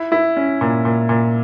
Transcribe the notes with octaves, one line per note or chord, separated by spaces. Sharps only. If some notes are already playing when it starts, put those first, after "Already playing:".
Already playing: E4
E4
C#4
A#2
A#2
A#2